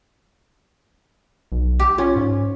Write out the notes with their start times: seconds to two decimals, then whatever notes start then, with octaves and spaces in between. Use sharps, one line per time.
1.52 B1
1.80 G4
1.98 C#4 F4
2.16 G#2